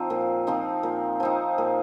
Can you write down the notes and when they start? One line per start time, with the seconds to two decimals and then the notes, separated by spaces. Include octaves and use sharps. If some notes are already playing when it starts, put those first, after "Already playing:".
Already playing: F3 C4 D#4
0.10 A#2
0.47 F3 C4 D#4
0.83 A#2
1.20 F3 C4 D#4
1.58 A#2